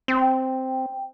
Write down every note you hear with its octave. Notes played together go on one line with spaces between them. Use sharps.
C4 G5